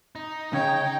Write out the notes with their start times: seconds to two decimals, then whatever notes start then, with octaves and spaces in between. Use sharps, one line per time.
0.16 D#4
0.53 C#3 C#5 G5